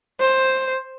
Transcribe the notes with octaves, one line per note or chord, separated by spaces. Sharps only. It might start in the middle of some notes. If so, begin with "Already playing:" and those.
C5